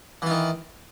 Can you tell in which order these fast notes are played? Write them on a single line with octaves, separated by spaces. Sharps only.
E3 F4 D#3